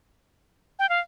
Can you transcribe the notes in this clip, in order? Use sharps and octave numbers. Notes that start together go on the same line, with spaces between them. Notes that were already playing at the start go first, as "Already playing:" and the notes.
G5
F5